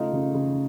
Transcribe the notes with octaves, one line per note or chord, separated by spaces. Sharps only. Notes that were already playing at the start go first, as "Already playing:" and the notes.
Already playing: C#3 A3 D#4 F4
C#3
C#3